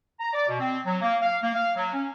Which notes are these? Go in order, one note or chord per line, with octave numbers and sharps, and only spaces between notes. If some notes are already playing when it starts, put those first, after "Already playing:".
A#5
D5
B2
C4
F#3
A#3
F5
A#3
F5
F#3
C#4